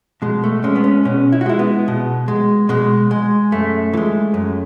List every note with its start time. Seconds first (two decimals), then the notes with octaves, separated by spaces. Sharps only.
0.22 B2 G#3
0.44 A3
0.64 G#3 C#4
0.76 B3
0.84 C#4
1.05 B2 C#4
1.32 E4
1.41 F#4
1.46 G#3 E4
1.59 B3
1.88 B2
2.28 G#3
2.69 B2 G#3
3.11 G#3
3.52 F#2 A3
3.93 E3
3.97 G#3
4.34 F#2